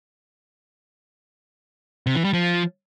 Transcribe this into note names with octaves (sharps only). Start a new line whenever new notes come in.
C3
E3
G3
F3